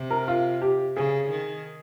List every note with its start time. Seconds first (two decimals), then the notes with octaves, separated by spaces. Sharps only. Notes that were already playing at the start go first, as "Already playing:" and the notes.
Already playing: C3
0.11 A#4
0.28 F4
0.62 G4
0.96 C#3 G#4
1.30 D#3